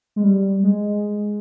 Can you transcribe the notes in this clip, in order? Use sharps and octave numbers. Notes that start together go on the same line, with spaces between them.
G#3
G3
G#3